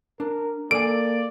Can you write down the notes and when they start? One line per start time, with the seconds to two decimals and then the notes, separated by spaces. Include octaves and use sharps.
0.20 D4 A#4
0.71 A#3 A4 D5 G#5 D7